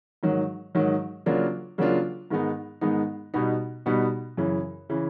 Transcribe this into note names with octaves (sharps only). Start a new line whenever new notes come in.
G#2 D#3 F#3
G#2 D#3 F#3
C#3 F#3 A#3 D4 F4
C#3 F#3 A#3 D4 F4
G#2 D#3 G#3 B3 D#4
G#2 D#3 G#3 B3 D#4
B2 G3 B3 D#4
B2 G3 B3 D#4
F#2 C#3 E3
C#3 E3